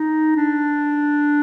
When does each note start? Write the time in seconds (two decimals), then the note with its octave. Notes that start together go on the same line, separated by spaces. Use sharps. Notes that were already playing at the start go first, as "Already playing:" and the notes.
Already playing: D#4
0.36 D4